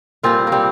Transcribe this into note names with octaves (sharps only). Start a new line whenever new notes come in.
A#2 G3 C4 F4
A#3
G3 C4